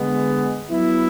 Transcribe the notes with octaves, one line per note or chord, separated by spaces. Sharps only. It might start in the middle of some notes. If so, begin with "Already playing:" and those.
Already playing: D3 G#3 B3
F#3 B3 E4